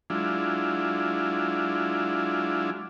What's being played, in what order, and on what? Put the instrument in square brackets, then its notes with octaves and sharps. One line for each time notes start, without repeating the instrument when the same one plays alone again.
[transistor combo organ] F#3 G#3 D4 E4 F4